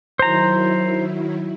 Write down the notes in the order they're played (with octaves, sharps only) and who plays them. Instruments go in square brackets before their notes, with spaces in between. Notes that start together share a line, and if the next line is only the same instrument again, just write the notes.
[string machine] D#3 F#3 E4 [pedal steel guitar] C5 A#5